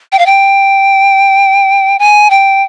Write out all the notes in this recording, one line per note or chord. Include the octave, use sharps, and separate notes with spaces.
G5
F5
G5
G#5
G5